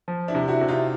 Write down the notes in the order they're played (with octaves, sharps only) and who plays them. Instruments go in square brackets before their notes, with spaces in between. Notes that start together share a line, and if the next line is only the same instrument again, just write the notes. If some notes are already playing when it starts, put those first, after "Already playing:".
[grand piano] F3
[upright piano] D4 E4
[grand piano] C3
[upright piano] E4 F#4
[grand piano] C3
[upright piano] D#4 F4